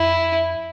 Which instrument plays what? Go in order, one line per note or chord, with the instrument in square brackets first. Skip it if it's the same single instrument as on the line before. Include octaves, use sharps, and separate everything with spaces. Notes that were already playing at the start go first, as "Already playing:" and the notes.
Already playing: [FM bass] F2 [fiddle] E4